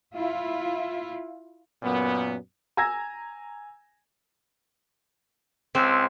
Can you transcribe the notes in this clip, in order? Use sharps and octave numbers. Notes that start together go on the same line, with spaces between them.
E4 F4
F#2 A#2 B3
G#5 A#5 E6 G#6 A#6
C#2 C4